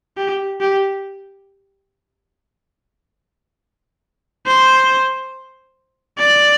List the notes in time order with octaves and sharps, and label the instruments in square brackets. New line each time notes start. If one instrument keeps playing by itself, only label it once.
[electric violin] G4
G4
C5
D5